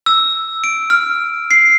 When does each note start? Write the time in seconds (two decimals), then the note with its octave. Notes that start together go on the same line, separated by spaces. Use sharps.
0.06 E6
0.64 D7
0.90 F6
1.51 C7